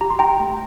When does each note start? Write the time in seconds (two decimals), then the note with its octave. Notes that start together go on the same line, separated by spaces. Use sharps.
0.01 G4 A#5
0.10 C6
0.19 G4 G5 A#5
0.40 A3